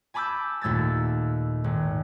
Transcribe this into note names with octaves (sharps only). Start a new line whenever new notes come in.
G#5 A5 B5 D6 E6 G6
D#2 A#2 A3 E6 G#6 A6
G#1